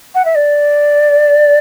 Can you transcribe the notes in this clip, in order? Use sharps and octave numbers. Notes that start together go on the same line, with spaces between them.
F#5
E5
D5